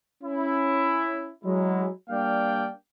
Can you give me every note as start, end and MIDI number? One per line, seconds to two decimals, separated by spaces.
0.23 1.30 61
0.23 1.30 64
1.44 1.88 54
1.44 1.88 56
1.44 1.88 64
2.09 2.68 55
2.09 2.68 58
2.09 2.68 62
2.09 2.68 74
2.09 2.68 77
2.09 2.68 79